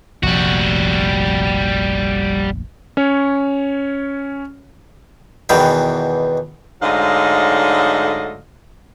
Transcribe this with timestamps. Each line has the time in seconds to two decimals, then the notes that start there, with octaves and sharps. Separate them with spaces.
0.23 F1 A#1 G3 F#4
2.97 C#4 C#5
5.49 E2 B2 D#3 E3 G5
6.82 G#2 D3 F#3 A3 D#5 F5